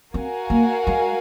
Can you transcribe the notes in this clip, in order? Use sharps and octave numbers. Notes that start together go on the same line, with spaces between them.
C4 F#4 A#4 F5 G#5
A#3
G#3